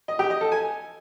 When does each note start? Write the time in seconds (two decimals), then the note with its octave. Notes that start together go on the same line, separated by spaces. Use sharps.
0.08 D#5
0.19 G4
0.30 D#5
0.41 A4
0.52 G#5